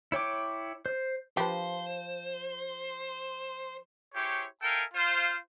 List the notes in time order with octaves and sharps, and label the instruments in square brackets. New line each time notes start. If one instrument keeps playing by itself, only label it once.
[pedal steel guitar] E4 C#5 G5 D6
C5
[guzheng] F3 [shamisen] G4 B4 [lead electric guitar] C5
[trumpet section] E4 G4 G#4 C5 C#5
A4 A#4 E5 F5 G5 G#5
F4 C5 F5